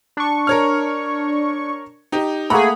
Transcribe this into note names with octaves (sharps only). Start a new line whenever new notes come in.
D4 C#6
A#4 C#5 F6
D#4 G4
A3 A#3 G#4 F#5 A#5 B5